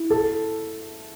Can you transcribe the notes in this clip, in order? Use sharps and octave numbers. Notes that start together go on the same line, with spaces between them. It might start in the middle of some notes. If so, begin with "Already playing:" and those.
Already playing: E4
A4